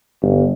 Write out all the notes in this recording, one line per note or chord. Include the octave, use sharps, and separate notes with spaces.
G1